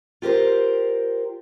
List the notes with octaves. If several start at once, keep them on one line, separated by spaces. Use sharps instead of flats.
F4 G4 A#4 C5